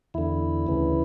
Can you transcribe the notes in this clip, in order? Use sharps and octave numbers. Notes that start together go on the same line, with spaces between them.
E2 D3 E4
D2 C#3 E3